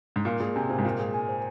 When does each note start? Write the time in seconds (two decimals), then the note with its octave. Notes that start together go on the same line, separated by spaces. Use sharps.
0.16 G#2
0.25 A#2 F5
0.40 A#2 G#4
0.56 C3 G#5
0.70 A#2 C5
0.78 G#2
0.84 A#2 F5
0.99 G#4
1.14 G#5
1.29 C5